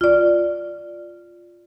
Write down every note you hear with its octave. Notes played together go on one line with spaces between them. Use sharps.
F4 D5